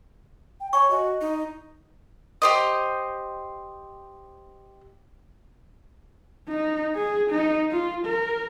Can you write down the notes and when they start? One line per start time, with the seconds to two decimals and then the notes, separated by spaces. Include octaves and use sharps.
0.60 G5
0.73 C#5 G#5 C#6
0.91 F#4 D#5
1.21 D#4
2.42 G4 C5 D#5
6.48 D#4
6.96 G#4
7.30 D#4
7.71 F4
8.06 A#4